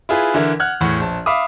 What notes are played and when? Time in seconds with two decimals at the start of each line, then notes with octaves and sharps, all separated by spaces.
0.09 E4 F4 G#4 B4
0.34 D3 E3 E4 A#4
0.60 F#5 F6 F#6 G#6
0.80 E2 A2 F#5
1.00 A#1 A5
1.26 E5 F5 B5 D6 D#6